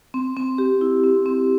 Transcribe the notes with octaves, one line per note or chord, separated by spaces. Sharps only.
C4
C4
G4
E4
C4
C4